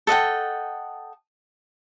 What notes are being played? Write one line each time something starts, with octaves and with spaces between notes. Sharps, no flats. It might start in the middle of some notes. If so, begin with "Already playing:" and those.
A4 D#5 F#5 G5